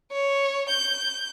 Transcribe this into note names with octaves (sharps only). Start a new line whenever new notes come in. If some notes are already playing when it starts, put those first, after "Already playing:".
C#5
G6